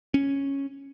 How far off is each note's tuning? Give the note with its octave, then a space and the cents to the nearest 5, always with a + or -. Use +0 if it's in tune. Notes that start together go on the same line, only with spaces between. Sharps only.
C#4 -5